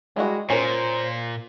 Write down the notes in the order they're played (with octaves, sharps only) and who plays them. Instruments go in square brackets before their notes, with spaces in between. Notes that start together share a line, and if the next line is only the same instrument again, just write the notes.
[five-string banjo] G3 E4 F#4 [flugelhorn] G#3
[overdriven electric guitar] A#2 [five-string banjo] C#4 A#4 [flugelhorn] C5